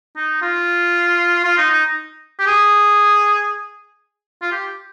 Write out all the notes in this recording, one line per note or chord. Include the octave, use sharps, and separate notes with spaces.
D#4
F4
F4
D#4
D#4
G4
G#4
F4
G4